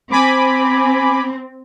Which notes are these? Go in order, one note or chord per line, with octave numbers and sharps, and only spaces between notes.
C4 G#5 B5 D6